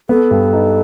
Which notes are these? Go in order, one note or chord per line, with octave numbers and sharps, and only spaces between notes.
B3 A4
G2
D#4